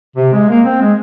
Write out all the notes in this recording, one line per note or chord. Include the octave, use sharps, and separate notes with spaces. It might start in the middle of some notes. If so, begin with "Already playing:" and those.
C3
G#3
A#3
C4
G#3